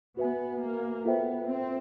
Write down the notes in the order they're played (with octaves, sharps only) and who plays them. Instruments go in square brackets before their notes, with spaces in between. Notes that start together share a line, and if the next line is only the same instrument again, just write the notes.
[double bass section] B3 [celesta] F#4 B4 E5 G#5
[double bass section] A#3
[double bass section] B3 [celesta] F4 A4 C5 E5 G5
[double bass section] C4